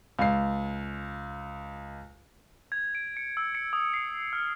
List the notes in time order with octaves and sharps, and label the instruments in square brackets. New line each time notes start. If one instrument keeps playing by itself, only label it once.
[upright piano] C#2 C7
[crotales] G#6
D7
C#7
E6
C#7
D#6
C7
F6